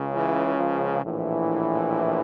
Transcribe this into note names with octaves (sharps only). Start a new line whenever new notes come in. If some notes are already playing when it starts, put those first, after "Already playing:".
Already playing: C#2 C#3
E3
F3
A#1 A2 E3